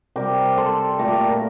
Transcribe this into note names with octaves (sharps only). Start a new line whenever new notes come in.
C3 G3 G4 A#4
A4 C5
A#2 A3 G4 A#4
A#4